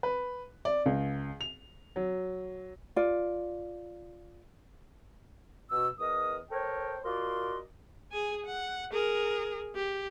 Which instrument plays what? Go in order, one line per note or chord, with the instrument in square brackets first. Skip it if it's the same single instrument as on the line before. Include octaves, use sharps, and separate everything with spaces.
[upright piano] B4
D5
C#2
F7
F#3
[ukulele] F4 D5
[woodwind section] B2 E6
E2 A#4 D#5 D#6
A4 A#4 C5 C#5 G5
F4 F#4 A#4 D5 D#5 C6
[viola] G#4 G#5
F#5
G#4 A#4
G4